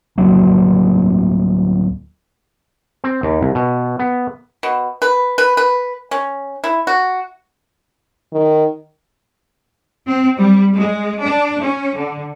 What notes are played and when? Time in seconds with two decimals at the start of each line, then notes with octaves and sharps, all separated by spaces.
0.18 D1 F#3 A#3
3.04 C4
3.23 D#2
3.41 C2
3.55 B2
3.99 B3
4.63 B2
5.02 B4
5.38 B4
5.57 B4
6.11 C#4
6.64 E4
6.87 F#4
8.32 D#3
10.07 C4
10.38 G3
10.76 G#3
11.21 D4
11.61 C#4
11.96 D3